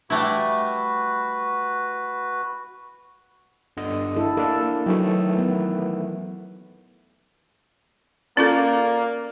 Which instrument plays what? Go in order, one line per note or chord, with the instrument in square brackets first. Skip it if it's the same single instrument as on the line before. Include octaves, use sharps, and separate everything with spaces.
[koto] G3 A3 E4 [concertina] F#4 B4
[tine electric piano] G1 D3 D#5
[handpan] E4 A4
[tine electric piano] A#3 D4 [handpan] A4
[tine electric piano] D#3 E3 A3 [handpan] F#3
[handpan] B3
[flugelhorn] A#3 [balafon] C#4 F4 A4 [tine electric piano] D5